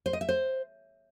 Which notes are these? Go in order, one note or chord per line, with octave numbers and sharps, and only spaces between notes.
C5
D#5
E5
C5